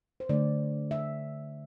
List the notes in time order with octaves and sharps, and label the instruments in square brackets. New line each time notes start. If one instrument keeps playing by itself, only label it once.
[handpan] C5
D3 A3 D5
E5